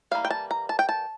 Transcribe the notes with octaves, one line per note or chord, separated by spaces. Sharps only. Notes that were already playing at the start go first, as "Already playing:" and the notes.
E3 G3 A#3 F5
G5
A5
A#5
A5
G5
A5